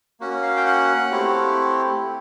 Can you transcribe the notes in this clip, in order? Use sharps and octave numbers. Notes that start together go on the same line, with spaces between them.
A#3 C#4 F#4
F5
G5
F#5
A3 C4 E4 G4